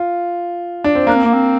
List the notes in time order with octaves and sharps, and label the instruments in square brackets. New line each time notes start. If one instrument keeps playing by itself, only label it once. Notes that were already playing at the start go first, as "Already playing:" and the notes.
Already playing: [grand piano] F4
D4
C4
[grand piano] A#3 [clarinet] D4
[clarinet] C4
A#3
C4